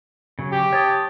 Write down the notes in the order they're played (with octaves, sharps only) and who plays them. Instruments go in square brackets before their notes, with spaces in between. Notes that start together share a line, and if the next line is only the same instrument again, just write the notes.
[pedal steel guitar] C#3 F#3
[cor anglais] G4
[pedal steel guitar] C#5 A5 D#6